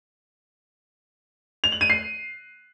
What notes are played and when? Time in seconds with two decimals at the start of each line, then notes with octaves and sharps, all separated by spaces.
1.64 F7
1.72 F#7
1.81 D#7
1.90 C7